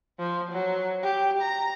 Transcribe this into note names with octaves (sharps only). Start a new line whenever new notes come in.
F3
F#3
G4
A#5